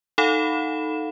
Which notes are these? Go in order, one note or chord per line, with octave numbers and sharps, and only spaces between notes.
D#4 A4 F5 F#5 B5 E7